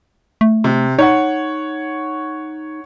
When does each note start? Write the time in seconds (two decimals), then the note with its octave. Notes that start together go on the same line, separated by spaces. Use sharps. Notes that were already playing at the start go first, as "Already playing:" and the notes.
0.41 A3
0.64 C3
0.99 D#4 C#5 F#5